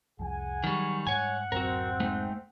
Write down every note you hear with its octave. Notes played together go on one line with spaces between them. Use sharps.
C2 F2 F3 G#4 F#5 G#5
D#3 F#3 G3 C#6
G#2 G3 G#3 C#5 F#5 G#5
D1 F#2 C4 F#4 A#4
G#3 A3 C4 D#4